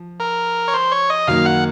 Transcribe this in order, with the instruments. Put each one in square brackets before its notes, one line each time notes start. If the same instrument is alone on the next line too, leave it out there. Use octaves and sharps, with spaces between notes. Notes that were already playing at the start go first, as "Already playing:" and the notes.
Already playing: [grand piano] F3
[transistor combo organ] A#4
C#5
C5
C#5
D#5
[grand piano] F#2 D#3 F#3 A#3 [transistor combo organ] F5
[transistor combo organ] F#5